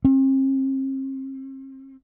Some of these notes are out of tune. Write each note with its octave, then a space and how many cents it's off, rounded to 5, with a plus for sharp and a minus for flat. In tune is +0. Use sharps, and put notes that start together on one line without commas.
C4 +40